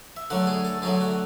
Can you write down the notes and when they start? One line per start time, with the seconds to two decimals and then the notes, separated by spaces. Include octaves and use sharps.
0.16 E5
0.30 D3 F#3 A3 F#5
0.47 G#4
0.65 A4
0.82 D3 F#3 A3 G#4
1.01 F#4